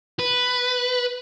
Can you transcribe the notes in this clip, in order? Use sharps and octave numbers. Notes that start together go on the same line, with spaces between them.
B4